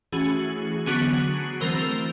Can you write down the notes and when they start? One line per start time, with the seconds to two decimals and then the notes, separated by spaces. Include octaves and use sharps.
0.12 E3 A3 C#4 F#4 G#4
0.86 D3 F#3 B3 D4 F#4 G#4
1.61 E3 A3 C4 A#4 C5